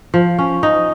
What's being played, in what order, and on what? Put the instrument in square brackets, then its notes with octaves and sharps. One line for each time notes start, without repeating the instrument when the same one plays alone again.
[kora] F3
C#4
D#4